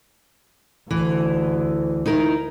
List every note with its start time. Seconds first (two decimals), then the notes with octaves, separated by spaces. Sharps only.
0.91 D2 E3
2.06 D#4 E4 A#4